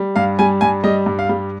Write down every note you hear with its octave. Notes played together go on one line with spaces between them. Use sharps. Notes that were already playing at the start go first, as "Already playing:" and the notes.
Already playing: G3
G2 F5
G3 G#5
G2 G#5
G3 D#5
G2
F5
G3